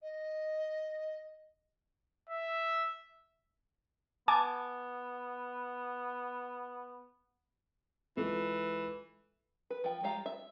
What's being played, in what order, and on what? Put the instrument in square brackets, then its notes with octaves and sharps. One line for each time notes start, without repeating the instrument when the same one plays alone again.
[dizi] D#5
[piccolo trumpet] E5
[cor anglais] B3 [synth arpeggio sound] G#5 A5 D6
[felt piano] C#2 G#3 A4 [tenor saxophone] E3
[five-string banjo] B4
F3 G5
G#3 F4 G4 F5 A#5
E5